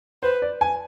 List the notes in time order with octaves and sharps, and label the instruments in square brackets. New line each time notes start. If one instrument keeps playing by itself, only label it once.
[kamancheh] B4 [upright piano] C5
[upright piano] D5
G#5